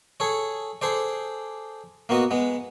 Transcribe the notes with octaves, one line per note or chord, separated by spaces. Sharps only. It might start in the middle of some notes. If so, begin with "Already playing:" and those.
G#4 A4 C#5
G#4 A4 C5 D5
A#3 B3 F#4 D#5
G#3 B3